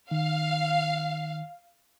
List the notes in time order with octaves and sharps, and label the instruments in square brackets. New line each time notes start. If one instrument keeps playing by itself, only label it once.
[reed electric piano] D#3 [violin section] F5